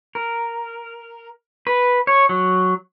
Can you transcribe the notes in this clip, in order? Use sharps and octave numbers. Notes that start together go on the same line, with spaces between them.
A#4
B4
C#5
F#3